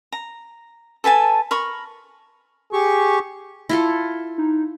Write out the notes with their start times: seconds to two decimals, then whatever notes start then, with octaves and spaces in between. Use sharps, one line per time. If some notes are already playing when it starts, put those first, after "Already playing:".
0.12 A#5
1.04 A4 B4 G#5 A5
1.51 A#4 B5 C#6
2.73 G4 G#4 C#6
3.69 E4 F4 A4
4.38 D#4